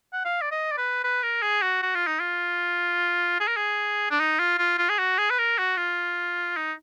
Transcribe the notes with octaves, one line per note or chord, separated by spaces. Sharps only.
F#5
F5
D5
D#5
D5
B4
B4
A#4
G#4
F#4
F#4
F4
D#4
F4
G#4
A#4
G#4
D4
D#4
F4
F4
F4
G#4
F#4
G#4
B4
A#4
F#4
F4
D#4